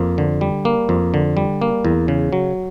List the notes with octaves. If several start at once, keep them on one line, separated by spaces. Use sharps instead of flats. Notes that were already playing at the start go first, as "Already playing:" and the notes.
Already playing: F2 A#3
D3
G3
A#3
F2
D3
G3
A#3
E2
C#3
F#3